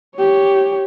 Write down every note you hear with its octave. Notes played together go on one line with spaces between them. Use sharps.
G4 C#5